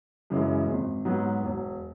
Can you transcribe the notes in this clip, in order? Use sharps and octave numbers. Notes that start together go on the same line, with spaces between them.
F#2 C#3 E3 G#3
G#1
G#2 F#3 B3
E1